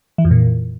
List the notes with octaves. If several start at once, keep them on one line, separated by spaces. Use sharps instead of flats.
E3
F2
A#2